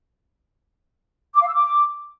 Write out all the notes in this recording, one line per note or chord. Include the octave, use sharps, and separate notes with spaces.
D6
F5
E6
D6